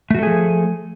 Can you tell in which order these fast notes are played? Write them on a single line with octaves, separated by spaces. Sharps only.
A3 F#4 A4 G#4 F3